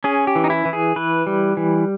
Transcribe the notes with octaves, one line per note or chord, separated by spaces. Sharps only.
C#4 G#4
G4
E3
D#4
E4
E3
G#4
E3 B4
G3
E3